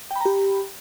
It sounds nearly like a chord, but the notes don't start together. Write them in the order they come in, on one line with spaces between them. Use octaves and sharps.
G5 B5 A#5 G4